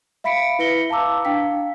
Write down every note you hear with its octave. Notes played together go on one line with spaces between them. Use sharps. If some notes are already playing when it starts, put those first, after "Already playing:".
E5 F5 B5 B6 C#7 D7
E4 B4 E5 A#6 C#7 G7
F5 A5 A#5 D6 E6
D4 F5 G5 B6